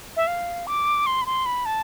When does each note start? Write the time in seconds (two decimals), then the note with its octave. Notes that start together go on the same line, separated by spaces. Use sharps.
0.17 E5
0.27 F5
0.67 D6
1.06 C6
1.22 B5
1.26 C6
1.46 B5
1.66 A5